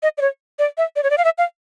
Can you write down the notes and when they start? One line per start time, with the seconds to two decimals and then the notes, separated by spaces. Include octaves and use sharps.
0.03 D#5
0.18 D5
0.21 C#5
0.59 D5
0.78 E5
0.96 D5
1.03 C#5
1.10 D5
1.18 F5
1.25 E5
1.38 F5